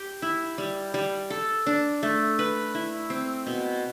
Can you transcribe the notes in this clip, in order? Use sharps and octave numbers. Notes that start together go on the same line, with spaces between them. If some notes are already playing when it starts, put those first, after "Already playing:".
Already playing: G4
E4
G3
G3
A4
D4
A3
B4
E4
C4
B2